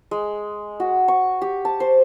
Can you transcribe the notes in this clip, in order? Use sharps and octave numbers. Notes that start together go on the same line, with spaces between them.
G#3
F#4
C#6
G4
A5
C5